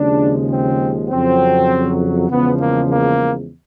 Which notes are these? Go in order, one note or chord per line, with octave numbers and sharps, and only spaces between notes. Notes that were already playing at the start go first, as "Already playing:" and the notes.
Already playing: D#2 C#3 F3 G#3 D4
C4
F2 C#3 F#3 C4
E2 C#3 F3 G#3 B3
A#3
A#3